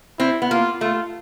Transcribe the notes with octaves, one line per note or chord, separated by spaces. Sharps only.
C4 E4
B3
A#3 F4
A3 F4